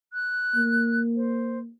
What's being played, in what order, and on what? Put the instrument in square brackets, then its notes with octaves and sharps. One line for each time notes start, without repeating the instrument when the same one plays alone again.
[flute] F#6
[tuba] A#3
[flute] C5